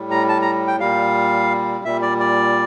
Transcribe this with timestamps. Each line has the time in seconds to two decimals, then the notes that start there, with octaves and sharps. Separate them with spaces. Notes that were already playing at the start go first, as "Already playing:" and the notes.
Already playing: A2 G3
0.11 A#5
0.29 A5
0.42 A#5
0.67 G5
0.80 A#2 G3 F5
1.85 A#2 G3 E5
2.02 D5
2.20 D5